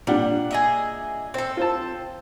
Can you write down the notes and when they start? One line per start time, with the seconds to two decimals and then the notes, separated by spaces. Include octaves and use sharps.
0.07 A#2 G3 D4 F#5
0.51 G#4 D#5 E5
1.34 C4 A4 C5
1.57 F4 C5 A5